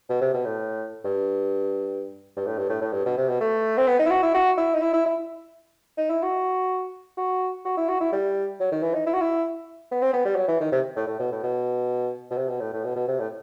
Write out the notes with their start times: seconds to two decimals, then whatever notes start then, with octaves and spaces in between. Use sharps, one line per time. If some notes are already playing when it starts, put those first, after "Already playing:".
0.09 B2
0.21 C3
0.34 B2
0.45 A2
1.05 G2
2.36 G2
2.46 A2
2.57 G2
2.69 A2
2.81 A2
2.93 G2
3.05 B2
3.17 C3
3.28 B2
3.41 A3
3.77 C4
3.87 B3
3.99 D#4
4.06 E4
4.10 F#4
4.22 E4
4.34 F#4
4.58 E4
4.75 D#4
4.82 E4
4.93 E4
5.06 E4
5.97 D#4
6.10 E4
6.23 F#4
7.17 F#4
7.65 F#4
7.77 E4
7.89 F#4
8.01 E4
8.12 G3
8.60 F#3
8.72 D#3
8.83 E3
8.94 D#4
9.06 E4
9.13 F#4
9.21 E4
9.92 B3
10.02 C4
10.13 B3
10.25 G3
10.36 F#3
10.48 E3
10.60 D#3
10.72 C3
10.96 A2
11.07 A2
11.19 B2
11.31 A2
11.43 B2
12.31 B2
12.37 C3
12.49 B2
12.60 A2
12.73 A2
12.84 B2
12.96 B2
13.08 C3
13.19 A2